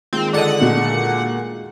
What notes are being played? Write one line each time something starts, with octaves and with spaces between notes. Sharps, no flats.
D#3 G#3 C4 F4
D3 D4 A4 D#5 F#5
A#2 F#4